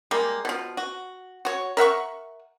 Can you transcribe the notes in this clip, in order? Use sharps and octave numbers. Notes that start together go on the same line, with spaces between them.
G3 G#3 A#3
B2 F3
F#4
F#4 C#5
A#4 E5 F#5 C#6